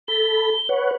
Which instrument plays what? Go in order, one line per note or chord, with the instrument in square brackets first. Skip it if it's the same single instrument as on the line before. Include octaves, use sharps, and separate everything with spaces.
[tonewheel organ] A4 B5 [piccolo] G7
[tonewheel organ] B4 C#5 F#5